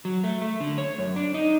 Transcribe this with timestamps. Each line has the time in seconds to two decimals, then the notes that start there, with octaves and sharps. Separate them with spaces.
0.05 F#3
0.24 A3
0.42 A3
0.60 D3
0.78 C#5
0.98 F#2
1.16 D4
1.34 D#4